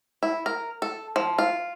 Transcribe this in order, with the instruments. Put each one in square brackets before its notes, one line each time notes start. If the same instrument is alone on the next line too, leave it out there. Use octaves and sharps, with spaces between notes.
[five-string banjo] E4
A#4
A4
F3
F4